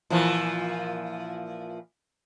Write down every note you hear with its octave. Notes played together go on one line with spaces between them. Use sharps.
A#2 E3 F3